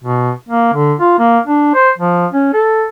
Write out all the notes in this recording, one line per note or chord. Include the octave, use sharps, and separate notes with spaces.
B2
A#3
D3
F4
A#3
D4
C5
F3
C#4
A4